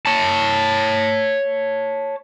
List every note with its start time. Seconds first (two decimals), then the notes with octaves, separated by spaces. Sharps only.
0.06 C#5 A5